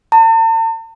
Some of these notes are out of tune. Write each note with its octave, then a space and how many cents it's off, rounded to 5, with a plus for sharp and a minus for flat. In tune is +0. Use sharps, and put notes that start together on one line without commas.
A5 +45